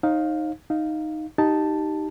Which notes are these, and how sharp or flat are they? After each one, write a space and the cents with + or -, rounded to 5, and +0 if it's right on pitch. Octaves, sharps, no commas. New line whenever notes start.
D#4 +0 C#5 -45 F5 +10
D#4 +0 F5 +0
D#4 +0 G4 -15 A5 +0